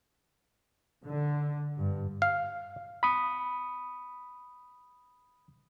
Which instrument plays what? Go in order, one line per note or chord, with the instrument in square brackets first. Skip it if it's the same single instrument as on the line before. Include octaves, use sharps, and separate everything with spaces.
[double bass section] D3
G2
[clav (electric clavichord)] F5
[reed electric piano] B5 D#6